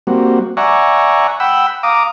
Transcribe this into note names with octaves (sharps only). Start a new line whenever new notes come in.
G3 A#3 C4 F#4
D5 E5 F#5 G#5 A#5 C#6
F#5 G5 B5 E6
F5 A#5 D6 D#6